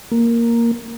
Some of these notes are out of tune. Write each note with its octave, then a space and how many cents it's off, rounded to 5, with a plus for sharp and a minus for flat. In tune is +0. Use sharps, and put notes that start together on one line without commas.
A#3 +0